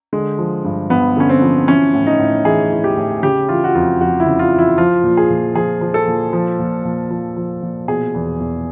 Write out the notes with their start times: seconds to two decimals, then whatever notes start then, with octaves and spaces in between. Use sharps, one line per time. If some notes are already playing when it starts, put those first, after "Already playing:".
0.13 D3 G#3
0.39 F3
0.64 G2
0.90 G2 B3
1.17 D3 C#4
1.29 C4
1.42 F3
1.68 E3 C#4
1.94 A2
2.06 D#4
2.19 A2
2.45 E3 G#4
2.71 E3
2.84 G4
2.97 A2
3.23 C#3 G4
3.48 E3 F4
3.64 F#4
3.75 F2 F4
4.00 F2 F#4
4.20 E4
4.26 C#3
4.39 F4
4.52 E3
4.59 E4
4.78 F3 F4
5.04 A#2
5.17 G#4
5.30 A#2
5.55 F3 G#4
5.81 F3
5.94 A4
6.07 A#2
6.33 F3
6.59 A#2
6.85 A#2
7.11 F3
7.36 F3
7.62 A#2
7.88 B2 G#4
8.14 E2
8.40 E2